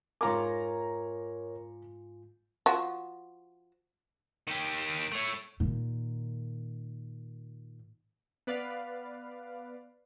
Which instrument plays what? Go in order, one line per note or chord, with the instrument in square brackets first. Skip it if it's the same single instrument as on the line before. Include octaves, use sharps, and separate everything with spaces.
[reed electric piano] G#2 F4 G#5 [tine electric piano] A#4 C#5 [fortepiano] A#5 D6
[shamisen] F3 F#4
[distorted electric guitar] D#3 G4
A3 C#5
[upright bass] A#2 D#3
[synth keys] B3 B4 D5 F5